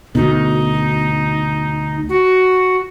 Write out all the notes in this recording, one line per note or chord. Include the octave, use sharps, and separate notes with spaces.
D2 B2 D#4
F#4